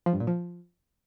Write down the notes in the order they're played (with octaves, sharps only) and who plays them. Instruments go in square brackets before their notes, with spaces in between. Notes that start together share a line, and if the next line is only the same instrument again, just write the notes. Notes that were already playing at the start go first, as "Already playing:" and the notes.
[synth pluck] F3
G2
A#2
F3